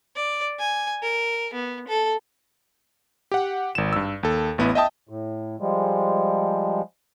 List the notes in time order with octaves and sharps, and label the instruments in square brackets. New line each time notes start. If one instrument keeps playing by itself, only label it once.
[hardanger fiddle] D5
G#5
A#4
B3
A4
[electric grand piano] G4 F#5
G#1 E7
G2 E6
D#2 A4
A1 B3 E4
D#5 E5 G5 A5 D#6
[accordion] A2
F3 G3 G#3